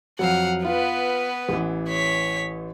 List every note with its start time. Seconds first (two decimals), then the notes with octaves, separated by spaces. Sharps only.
0.19 F2 F#3 F5 F#5
0.65 B3 F4 B4
1.49 A1 E3
1.89 C#5 B6